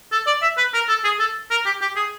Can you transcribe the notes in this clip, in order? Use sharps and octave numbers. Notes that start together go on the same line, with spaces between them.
A4
D5
E5
B4
A#4
A4
G#4
A4
A#4
G4
G4
G#4